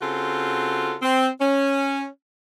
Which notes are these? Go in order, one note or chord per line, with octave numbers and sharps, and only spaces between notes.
C#3 C4 F4 F#4 A4
C4
C#4